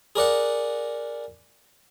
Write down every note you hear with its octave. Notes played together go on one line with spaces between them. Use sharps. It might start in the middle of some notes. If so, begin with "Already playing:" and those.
G#4 A#4 D5 F#5